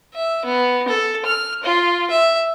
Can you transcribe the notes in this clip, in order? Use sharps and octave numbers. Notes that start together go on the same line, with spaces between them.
E5
B3
A4
F6
F4
E5